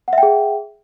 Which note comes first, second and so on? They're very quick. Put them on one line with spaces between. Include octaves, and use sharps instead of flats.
F#5 E5 G5 G#4